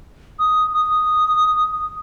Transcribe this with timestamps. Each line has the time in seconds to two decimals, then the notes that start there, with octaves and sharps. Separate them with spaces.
0.39 D#6
0.73 D#6